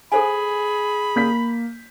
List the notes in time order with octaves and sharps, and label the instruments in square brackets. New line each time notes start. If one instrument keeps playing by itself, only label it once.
[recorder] G#4 [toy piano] A4 C5 G#5 [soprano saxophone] B5
[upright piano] A#3 G6 B6